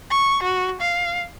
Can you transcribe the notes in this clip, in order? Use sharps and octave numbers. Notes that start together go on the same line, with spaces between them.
C#6
F#4
F5